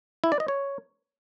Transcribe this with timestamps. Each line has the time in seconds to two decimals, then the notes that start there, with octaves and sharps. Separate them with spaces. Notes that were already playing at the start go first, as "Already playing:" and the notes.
0.24 E4
0.32 D5
0.40 D#5
0.48 C#5